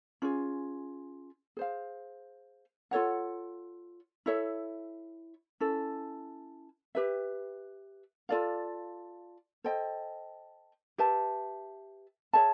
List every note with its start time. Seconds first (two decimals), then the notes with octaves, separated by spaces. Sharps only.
0.22 C#4 F4 G#4
1.57 G#4 C5 F5
2.91 F4 A4 C#5 F#5
4.26 E4 A4 C#5 E5
5.60 C#4 E4 A4
6.95 G4 B4 E5
8.29 F4 A4 D5 F5
9.64 A4 C5 D#5 G5
10.98 G4 B4 E5 A5
12.33 G#4 C#5 E5 A5